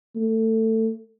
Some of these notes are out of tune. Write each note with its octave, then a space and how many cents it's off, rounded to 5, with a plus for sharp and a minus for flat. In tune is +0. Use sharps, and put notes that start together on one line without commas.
A3 +20